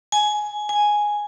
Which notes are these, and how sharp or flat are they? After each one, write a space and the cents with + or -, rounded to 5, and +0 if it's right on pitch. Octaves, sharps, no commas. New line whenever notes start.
G#5 +15
G#5 +0